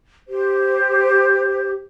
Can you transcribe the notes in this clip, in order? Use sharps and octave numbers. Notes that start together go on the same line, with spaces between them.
G4 C5